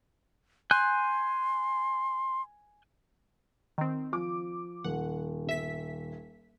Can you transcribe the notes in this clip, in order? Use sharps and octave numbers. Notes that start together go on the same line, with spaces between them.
G#5 C6 F#6 G6
D#3 C4
F3 D6
D#1 F#5
G1 E5 B6